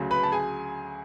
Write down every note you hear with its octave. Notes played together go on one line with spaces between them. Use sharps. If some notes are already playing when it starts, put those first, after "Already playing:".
Already playing: D2 C#3 F#3
B4 B5
A5
G#4 G#5